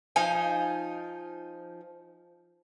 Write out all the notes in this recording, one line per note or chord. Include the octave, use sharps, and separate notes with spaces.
F3 D#4 G#5